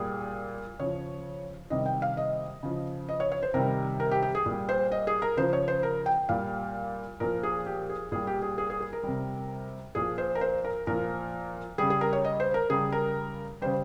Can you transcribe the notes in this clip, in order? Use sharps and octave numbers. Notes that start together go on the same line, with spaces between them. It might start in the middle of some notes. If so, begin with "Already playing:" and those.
Already playing: A#2 G3 G#4
C#3 F3 C#5
C3 D#3 G3 D#5
G5
F5
D#5
C#3 F3
D#5
C#5
C#5
C5
C3 D#3 G3 A#4
A#4
G4
G4
G#4
A#2 G3
C5
D#5
G#4
A#4
C#3 F3 C5
C#5
C5
A#4
G5
A#2 G3 F5
A#2 F3 A#4
G#4
G4
G#4
A#2 G3 G#4
G4
G#4
G#4
G#4
G#4
A#4
C3 G3
A#2 F3 G#4
C5
A#4
C5
A#4
A#2 F3 A#4
C#3 G3 G#4
G#4
A#4
C#5
D#5
C5
A#4
C#3 G3 G#4
A#4
C#3 G3 C5